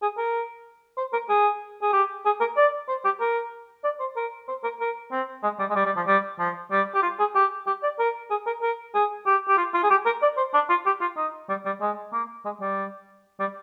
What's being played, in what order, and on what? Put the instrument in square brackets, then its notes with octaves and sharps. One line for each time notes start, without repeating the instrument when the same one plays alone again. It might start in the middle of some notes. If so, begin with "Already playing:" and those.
[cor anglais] G#4
A#4
C5
A#4
G#4
G#4
G4
G#4
A#4
D5
C5
G4
A#4
D5
C5
A#4
C5
A#4
A#4
C4
G#3
G3
G#3
G3
G3
F3
G3
F3
G3
G4
F4
G#4
G4
G4
D5
A#4
G#4
A#4
A#4
G#4
G4
G4
F4
F4
G#4
G4
A#4
D5
C5
D4
F4
G4
F4
D#4
G3
G3
G#3
A#3
G#3
G3
G3